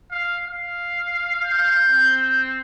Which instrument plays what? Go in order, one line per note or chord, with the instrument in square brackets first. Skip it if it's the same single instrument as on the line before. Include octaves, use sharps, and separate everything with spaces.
[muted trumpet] F5
F5
[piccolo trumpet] G6
[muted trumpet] C4